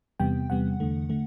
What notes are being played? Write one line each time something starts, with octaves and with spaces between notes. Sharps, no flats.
E2 C3 G3 B3 G5
E2 C3 G3 B3 F#5
E2 D3 A3
D3 A3